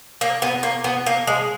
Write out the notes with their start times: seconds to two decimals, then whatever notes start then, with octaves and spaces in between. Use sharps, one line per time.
0.21 A#3
0.42 B3
0.63 A#3
0.84 B3
1.06 A#3
1.27 G#3